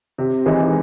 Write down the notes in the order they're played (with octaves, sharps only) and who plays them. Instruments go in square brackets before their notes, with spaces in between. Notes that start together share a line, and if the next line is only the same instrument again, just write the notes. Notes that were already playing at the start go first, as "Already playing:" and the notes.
[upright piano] C3
E3 G#3 D#4